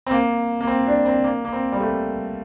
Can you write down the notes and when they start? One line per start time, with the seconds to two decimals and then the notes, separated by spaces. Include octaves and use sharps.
0.06 C4
0.11 A#3
0.61 A#3
0.67 C4
0.87 D4
1.05 C4
1.24 A#3
1.45 A#3
1.53 C4
1.72 G3
1.80 A3